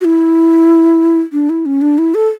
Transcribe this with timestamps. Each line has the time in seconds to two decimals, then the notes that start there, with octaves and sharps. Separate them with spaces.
0.01 F#4
0.05 E4
1.32 D4
1.50 E4
1.66 C#4
1.82 D4
1.98 E4
2.15 A4